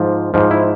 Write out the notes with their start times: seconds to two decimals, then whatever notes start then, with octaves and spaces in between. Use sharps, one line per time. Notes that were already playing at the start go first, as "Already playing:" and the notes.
Already playing: G#2 F3
0.34 G#2 F3
0.51 E4